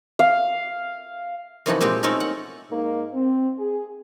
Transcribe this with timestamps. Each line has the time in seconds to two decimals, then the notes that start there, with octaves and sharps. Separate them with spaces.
0.19 F5
1.66 F#2 C3 E3 F3 D#4 F#4
1.81 A#2 G#3 C4 D#4 G4
2.03 A3 C4 C#4 D#4 A4 A#4
2.20 F#5
2.71 G#2 A#3 D#4
3.14 C4
3.59 G#4